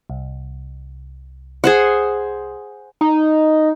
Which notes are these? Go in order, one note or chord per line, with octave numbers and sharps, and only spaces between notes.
C2
G#4 C5 F#5
D#4